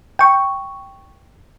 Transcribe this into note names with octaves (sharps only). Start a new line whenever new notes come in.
G5 C#6